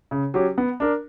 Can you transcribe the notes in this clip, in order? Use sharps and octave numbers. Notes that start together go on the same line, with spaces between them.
C#3
F#3 C#4 G4
B3
D4 A#4